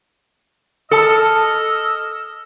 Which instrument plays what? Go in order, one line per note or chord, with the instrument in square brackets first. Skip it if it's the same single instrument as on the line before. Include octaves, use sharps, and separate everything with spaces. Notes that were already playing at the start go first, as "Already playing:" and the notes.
[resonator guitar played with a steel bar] A4 A5 [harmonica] D#5 E6 F6